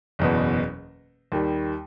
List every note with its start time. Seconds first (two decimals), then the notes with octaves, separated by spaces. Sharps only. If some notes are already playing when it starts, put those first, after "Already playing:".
0.19 F#1 E2 B2
1.32 D#2 D#3 G3